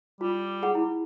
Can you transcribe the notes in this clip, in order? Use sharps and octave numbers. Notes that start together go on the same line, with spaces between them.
G3 F4
G#4 F#5
E4